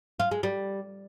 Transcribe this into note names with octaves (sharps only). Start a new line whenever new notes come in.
F4
G#3
G3